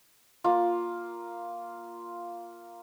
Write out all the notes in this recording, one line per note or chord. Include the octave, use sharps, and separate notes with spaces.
A#3 F4